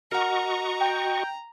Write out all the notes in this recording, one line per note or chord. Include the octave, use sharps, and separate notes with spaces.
F#4 A#4 D#5 F#5 A#5 C#6
G5